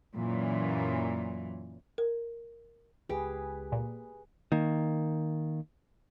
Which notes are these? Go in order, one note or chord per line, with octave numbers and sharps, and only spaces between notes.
F#2 A#2 E3
A#4
C#2 G4 G#4 B4
A#2
D#3 A#3